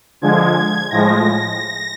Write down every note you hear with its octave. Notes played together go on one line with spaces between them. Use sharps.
D3 F3 G#3 G#6
A2 F3 G#3 A#6